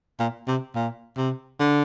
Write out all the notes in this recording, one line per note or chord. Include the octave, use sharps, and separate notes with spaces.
A#2
C3
A#2
C3
D3